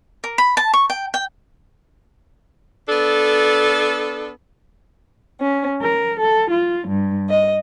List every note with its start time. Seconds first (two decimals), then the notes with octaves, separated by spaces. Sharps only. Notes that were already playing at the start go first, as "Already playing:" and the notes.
0.24 A#4
0.38 B5
0.57 A5
0.74 C#6
0.90 G5
1.14 G5
2.89 B3 D4 A4
5.39 C#4
5.81 A#4
6.18 A4
6.50 F4
6.87 G2
7.29 D#5